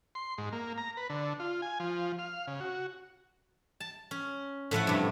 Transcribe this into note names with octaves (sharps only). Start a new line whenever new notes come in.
C6
G#2
A#3
A#5
B4
D3
F4
G#5
F3
F5
C#3
F#4
A5
C#4
A2 F3 A3 F#5
G2 C3